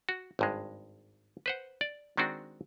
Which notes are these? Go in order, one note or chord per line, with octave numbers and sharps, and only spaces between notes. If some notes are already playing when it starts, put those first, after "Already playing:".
F#4
G#1 G2 G#3
B4 C5 F#5
D5
D#3 G#3 C4 D4 F#4